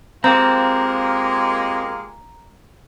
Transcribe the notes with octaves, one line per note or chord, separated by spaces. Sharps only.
G#3 A#3 C4 F4 G4 A#4 A#5